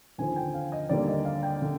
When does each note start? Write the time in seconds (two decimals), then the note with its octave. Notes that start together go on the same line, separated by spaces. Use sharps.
0.18 D#2 D3 F3 G#5
0.36 G5
0.54 F5
0.72 D#5
0.89 D#2 D3 G3 A#3 D5
1.08 D#5
1.25 F5
1.43 G5
1.62 D3